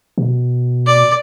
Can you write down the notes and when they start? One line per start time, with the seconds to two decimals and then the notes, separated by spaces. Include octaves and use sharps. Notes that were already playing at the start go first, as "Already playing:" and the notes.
0.18 B2
0.86 D5